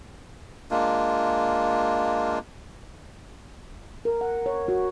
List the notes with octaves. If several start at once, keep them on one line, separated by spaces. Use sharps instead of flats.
G#3 A#3 D4 F4
A#4
F#5
C#5
F#4